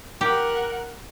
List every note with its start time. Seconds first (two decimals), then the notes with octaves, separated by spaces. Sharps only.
0.21 G4 A#4 F#5